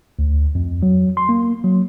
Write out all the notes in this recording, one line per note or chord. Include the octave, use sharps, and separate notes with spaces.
D2
F2
F#3
C6
A#3
F#3